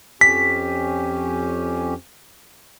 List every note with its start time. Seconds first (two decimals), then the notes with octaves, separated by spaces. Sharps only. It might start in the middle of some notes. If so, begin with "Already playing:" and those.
0.21 F2 C#4 G4 B6